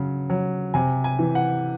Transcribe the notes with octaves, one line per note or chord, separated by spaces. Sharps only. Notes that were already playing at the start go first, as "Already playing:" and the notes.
Already playing: C#3 F#3
F#3
C3 G#5
G#5
E3
F#5